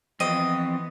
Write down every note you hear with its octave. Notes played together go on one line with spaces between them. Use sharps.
F2 E3 B3 C4 D#5